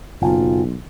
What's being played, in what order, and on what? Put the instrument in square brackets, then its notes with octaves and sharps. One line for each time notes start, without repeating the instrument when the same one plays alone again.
[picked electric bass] F#1 [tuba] B1 [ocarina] F4